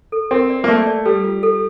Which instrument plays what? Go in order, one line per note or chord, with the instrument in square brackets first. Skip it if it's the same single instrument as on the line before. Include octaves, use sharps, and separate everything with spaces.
[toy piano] A4
[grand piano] C4 [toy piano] A#4
[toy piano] D5
[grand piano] A#3
[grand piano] A3 [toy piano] D5
[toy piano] D5
[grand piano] G3 [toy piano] A4
[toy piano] F4
A4